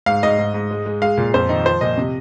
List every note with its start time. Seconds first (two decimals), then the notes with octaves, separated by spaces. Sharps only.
0.06 G#2 F5
0.23 G#2 D#5
0.38 G#2
0.54 G#2
0.71 G#3
0.86 G#3
1.02 G#3 F5
1.17 A#2
1.34 F2 C5
1.49 D#3 D#4
1.65 F3 C5
1.81 A#2 D#5
1.97 C3